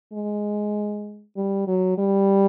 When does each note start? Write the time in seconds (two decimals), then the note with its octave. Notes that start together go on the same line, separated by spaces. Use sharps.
0.13 G#3
1.37 G3
1.67 F#3
1.98 G3